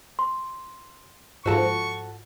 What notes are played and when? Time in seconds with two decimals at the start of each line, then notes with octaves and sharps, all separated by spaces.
0.19 C6
1.46 G#2 F3 F#4 A4 C#6